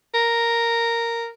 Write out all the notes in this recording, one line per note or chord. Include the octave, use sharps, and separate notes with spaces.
A#4